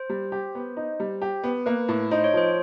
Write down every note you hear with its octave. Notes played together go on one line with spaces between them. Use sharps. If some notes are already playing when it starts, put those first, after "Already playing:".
Already playing: C5
G3
G4
B3
D#4
G3
G4
B3
A#3 B4
A2
D#4 C5
C#5
F3 C5